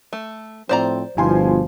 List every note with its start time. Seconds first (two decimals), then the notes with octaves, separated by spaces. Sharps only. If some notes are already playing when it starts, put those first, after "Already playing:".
0.13 A3
0.69 A2 F3 C4 C5 D5 A#5
1.17 G1 B2 F3 E4 G#5 C6